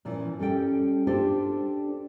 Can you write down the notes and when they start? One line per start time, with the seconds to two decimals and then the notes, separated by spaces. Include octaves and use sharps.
0.05 A#2 E3 F3 C#4
0.39 G3 C#4 A4 G5
1.07 D4 F4 G4 A4 C5